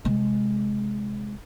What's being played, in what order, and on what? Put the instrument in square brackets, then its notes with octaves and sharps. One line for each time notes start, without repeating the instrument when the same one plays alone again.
[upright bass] C3 G#3